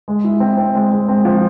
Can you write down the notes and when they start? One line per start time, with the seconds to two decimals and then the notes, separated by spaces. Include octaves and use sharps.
0.08 G#3
0.24 E4
0.40 C4
0.57 C4
0.75 G#3
0.91 G#3
1.08 C4
1.25 F3